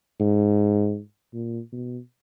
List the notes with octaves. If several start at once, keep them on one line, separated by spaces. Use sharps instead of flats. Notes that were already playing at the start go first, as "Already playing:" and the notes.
G#2
A#2
B2